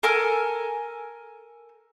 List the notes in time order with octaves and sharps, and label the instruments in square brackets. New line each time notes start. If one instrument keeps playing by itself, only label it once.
[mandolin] A4 A#4 G#5 F6